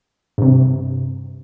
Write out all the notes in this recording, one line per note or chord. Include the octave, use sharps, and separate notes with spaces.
G2 C3